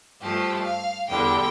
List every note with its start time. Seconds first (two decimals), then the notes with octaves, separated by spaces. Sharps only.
0.21 G2 F3 A3 G4
0.65 F5
1.09 E2 D3 G3 G5